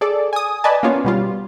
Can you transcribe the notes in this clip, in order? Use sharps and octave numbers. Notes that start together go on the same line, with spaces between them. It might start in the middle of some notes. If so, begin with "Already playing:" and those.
G#4 A4 D5
G#5 D#6
B4 D5 D#5 G#5 A5
A#3 B3 C#4 F4
B2 G3 F4